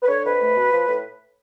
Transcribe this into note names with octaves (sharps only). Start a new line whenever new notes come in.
B4
D3 C#5
F2 B4
A3
B2
F3
A2